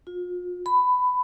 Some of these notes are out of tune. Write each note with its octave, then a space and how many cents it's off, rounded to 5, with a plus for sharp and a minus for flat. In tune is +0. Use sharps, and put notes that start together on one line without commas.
F4 +40
B5 +15